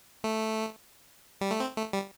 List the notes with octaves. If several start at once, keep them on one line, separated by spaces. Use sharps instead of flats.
A3
G3
A3
C4
A3
G3